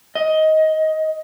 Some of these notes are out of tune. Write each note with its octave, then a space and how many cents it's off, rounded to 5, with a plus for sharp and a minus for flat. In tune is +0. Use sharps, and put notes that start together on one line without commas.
D#5 +15